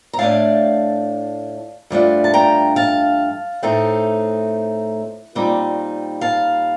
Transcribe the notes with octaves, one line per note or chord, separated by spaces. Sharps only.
A#5
A2 A3 D4 F5 A5
G2 F3 A3 D4
A5
G5 A#5
F5 A5
A2 A3 C4 D#4
A#2 G3 C4 D#4
F5 A5